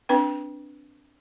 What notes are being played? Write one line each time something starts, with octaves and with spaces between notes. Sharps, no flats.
C4 D4 B4 G5